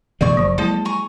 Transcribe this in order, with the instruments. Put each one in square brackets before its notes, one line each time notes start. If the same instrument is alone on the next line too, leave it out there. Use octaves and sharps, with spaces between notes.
[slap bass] B2 E3 G#3 [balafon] A#3 [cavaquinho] D5 C#6
[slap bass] F#1 [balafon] F3 F#3
[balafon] F#3 A#3 E4 [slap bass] G#3 [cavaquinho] A4
[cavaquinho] G#5 A#5 C#6